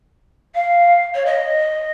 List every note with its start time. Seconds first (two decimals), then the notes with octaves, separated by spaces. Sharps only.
0.55 F5
1.15 C#5
1.26 D#5